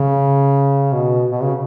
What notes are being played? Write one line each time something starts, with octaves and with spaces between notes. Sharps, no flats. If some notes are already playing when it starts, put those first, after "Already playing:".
Already playing: C#3
B2
B2
C#3